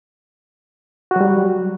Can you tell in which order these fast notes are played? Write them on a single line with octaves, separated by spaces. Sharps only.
F#4 F#3 G3